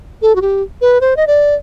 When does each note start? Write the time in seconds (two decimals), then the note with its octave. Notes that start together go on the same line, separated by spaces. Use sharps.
0.22 A4
0.36 F#4
0.41 G4
0.81 B4
1.01 C5
1.17 D#5
1.27 D5